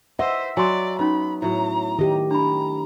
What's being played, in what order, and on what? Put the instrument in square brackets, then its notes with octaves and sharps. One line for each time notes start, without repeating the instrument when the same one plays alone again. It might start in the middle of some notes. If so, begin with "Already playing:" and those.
[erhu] C5 [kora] D#5 [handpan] E5 [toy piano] F#5
[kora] F#3 [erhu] D5 [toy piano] G#5 C6
[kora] B3 [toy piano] C#4 D#4 E6 [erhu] B5
[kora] A2 F#3 [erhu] A#5
[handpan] D#3 G4 [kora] D#5
[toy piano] D4 B5 [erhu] A#5